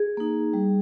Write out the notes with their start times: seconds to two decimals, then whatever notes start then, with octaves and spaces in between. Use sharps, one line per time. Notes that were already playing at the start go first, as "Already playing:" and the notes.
Already playing: G#4
0.17 A#3 D#4
0.53 G3